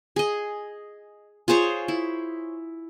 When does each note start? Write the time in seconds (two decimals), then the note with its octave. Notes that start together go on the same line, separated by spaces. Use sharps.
0.16 G#4 D#5
1.48 F4 G#4 C5 C#5
1.88 E4